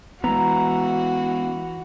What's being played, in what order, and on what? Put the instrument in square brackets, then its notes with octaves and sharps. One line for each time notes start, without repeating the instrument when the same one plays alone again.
[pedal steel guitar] E3 A#5 [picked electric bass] G#3 B3 [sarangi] F#4